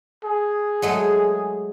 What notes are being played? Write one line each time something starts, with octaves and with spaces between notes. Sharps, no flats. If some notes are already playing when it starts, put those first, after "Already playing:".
G#4
F#3 G#3 A3